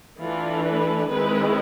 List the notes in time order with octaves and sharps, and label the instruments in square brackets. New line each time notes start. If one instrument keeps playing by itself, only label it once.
[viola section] E3 A3 D4 F4
B4
D#3 G#3 C4 E4 B4